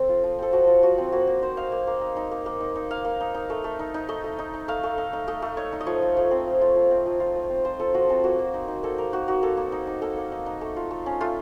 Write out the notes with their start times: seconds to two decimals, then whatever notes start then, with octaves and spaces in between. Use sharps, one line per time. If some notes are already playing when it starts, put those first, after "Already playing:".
Already playing: C4 A4
0.09 F4
0.24 F3
0.39 C4 A4
0.53 F3 F#4
0.67 F4
0.83 F3 F#4
0.98 C4
1.12 A#3 F#4
1.27 A#3
1.42 D#4 C5
1.57 D#4 F5
1.72 A#3
1.87 A#3
2.01 D#4
2.16 D#4
2.31 A#3
2.46 A#3
2.60 D#4
2.75 D#4
2.91 A#3 F5
3.05 A#3
3.20 D#4
3.34 D#4
3.50 A3
3.64 A3
3.79 D#4
3.94 D#4
4.09 A3 D#5
4.24 A3
4.38 D#4
4.53 D#4
4.68 A3 F5
4.83 A3
4.98 D#4
5.13 D#4
5.28 A3 D#5
5.42 A3
5.57 D#4 C#5
5.72 D#4
5.81 D#5
5.87 F3 C#5
6.02 F4
6.17 F3
6.31 C4
6.46 F3
6.61 F4
6.75 F3
6.91 C4
7.06 F3
7.20 F4
7.35 F3
7.50 C4
7.65 F3 C5
7.80 F4 A4
7.94 F3 F#4
8.09 C4 A4
8.24 A#3 F#4
8.39 A#3
8.54 D#4
8.68 D#4
8.83 A#3 A4
8.98 A#3 A#4
9.13 D#4 F#4
9.28 D#4 F#4
9.43 A#3 A4
9.57 A#3
9.72 D#4
9.87 D#4
10.02 A#3 A4
10.17 A#3
10.32 D#4
10.46 D#4
10.61 A3
10.76 F4
10.91 A3
11.06 C#4
11.21 A3 F4